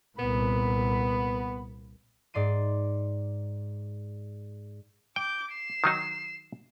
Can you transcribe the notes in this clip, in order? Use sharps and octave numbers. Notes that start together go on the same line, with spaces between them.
C2 A#2 B3 B5
G#2 D5 C6 D#7
G5 D6 G6
C7 E7
D#3 F#3 D#4